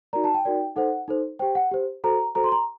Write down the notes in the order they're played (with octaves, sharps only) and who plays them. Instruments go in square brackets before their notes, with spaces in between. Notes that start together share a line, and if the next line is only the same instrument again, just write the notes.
[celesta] D#4 F#4 A#4 D5 A#5
A5
G5
D#4 F#4 A#4 D5
D#4 A4 C5 F#5
D#4 A4 C5
G4 C5 G5
F#5
G4 C5
F#4 A4 C5 A#5
F#4 A4 C5 A#5
C6
A#5